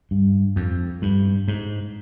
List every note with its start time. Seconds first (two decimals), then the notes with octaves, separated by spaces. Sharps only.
0.11 G2
0.56 F2
1.02 G2
1.48 G#2